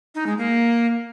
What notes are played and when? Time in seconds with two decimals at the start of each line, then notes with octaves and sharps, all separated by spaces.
0.15 D#4
0.26 G#3
0.38 A#3